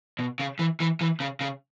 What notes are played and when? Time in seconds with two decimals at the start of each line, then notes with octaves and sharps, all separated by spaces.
0.19 B2
0.39 C#3
0.59 E3
0.80 E3
1.01 E3
1.20 C#3
1.41 C#3